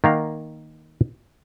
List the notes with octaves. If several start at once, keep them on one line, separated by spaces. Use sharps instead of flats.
D#3 A#3 F5 F#5